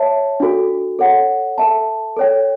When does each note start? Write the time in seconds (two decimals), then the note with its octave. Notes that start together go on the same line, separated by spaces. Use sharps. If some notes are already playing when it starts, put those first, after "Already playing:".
Already playing: C#5 E5 A5
0.40 D4 F#4 A4
0.99 A4 C#5 F#5
1.58 A4 E5 A5
2.17 A4 C#5 G5